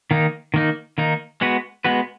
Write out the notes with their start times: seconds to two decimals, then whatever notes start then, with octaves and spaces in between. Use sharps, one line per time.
0.11 D#3 A#3 D#4
0.54 D#3 A#3 D#4
0.98 D#3 A#3 D#4
1.41 G#3 B3 F#4 B4
1.84 G#3 B3 F#4 B4